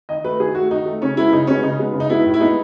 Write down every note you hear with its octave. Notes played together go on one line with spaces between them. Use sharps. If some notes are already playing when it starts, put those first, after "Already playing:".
D#3 D#5
A3 B4
D#3 G#4
A3 F#4
D#3 D#4
A3
C#3 C#4
G#3 B3 E4
C#3 D#4
G#3 B3 C#4
C#3 D#4
G#3 B3
C#3
D#4
G#3 B3 E4
A2
E4
G#3 B3 D#4